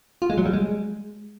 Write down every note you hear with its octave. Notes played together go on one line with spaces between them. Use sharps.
F4
G#3
F#3
G3
G#3